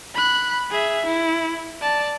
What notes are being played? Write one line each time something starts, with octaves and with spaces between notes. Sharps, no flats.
B5 F#6
G#4 E5
E4
D5 A5